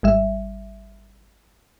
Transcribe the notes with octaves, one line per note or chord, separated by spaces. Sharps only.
G#1 G3 E5